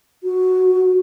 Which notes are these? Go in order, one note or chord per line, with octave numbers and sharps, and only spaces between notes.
F#4